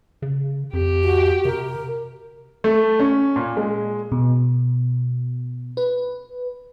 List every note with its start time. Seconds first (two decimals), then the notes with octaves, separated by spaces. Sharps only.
0.22 C#3
0.73 F2 G4
1.04 F#4
1.45 C3 A#4
2.64 A3
3.00 C#4
3.36 A#2
3.57 G#3
4.12 B2
5.77 B4